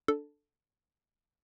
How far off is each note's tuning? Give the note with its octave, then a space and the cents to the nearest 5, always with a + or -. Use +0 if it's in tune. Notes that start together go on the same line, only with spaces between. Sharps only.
D4 +0 A4 +0